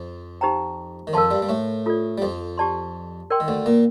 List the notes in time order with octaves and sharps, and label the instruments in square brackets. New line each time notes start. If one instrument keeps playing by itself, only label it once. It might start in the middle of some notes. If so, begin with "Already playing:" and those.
Already playing: [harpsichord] F2 F3
[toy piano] D#4 G4 C5 G5 A#5
[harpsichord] D#3
[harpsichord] F2 F3 [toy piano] A#4 F5 A5 C6
[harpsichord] G2 G3
G3
A2 A3
[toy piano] F4 A4 D5
[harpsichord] G3
F2 F3
[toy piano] G4 D5 A5 C6
A#4 D5 G5 C6
[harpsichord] D#3
D2 D3
A#2 A#3